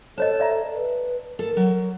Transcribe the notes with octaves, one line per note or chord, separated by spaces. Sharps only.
A4 C5 C#5 D#5 A5
D5 E5 A#5
B4
A4 A#4
F#3